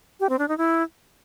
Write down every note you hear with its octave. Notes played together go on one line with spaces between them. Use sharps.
G4
C4
D4
D#4
E4